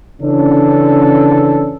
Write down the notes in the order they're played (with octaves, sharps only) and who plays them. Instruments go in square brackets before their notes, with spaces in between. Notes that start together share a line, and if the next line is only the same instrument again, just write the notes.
[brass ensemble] C#3 E3 C#4 D4 A4